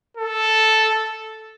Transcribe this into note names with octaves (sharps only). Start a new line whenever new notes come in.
A4